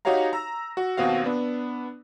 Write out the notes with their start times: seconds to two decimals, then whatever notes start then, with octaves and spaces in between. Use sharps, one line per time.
0.05 D#4 F#4 G4 C#5 F5 A#5
0.33 A#5 E6 A#6
0.77 F#4
0.97 D#2 B2 C4 F#4 F5
1.24 B3 D4